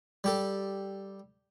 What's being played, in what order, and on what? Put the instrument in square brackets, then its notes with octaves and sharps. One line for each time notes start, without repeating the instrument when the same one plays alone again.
[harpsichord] G3 G4 A4